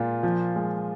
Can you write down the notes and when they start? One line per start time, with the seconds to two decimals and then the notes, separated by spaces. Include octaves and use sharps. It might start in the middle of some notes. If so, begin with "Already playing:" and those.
Already playing: A#2 G#3 F4
0.23 F3
0.56 G#3